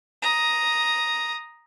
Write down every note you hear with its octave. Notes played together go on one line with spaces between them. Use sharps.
A#5 D#6